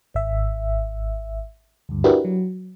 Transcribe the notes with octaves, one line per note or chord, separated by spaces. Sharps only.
G#1 E5
D2 G2
D4 E4 F#4 G4 A#4 B4
F#3